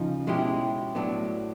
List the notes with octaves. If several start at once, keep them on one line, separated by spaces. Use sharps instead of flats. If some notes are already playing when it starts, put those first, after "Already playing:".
Already playing: C#3 F3 D#4
B2 G#3 C#4 E4 G4
A2 F#3 B3 D4